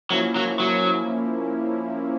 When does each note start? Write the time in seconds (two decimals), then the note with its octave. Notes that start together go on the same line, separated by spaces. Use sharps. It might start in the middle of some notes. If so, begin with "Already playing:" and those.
0.10 F3 F#3 A#3 C#4 E4
0.36 F#3
0.60 F#3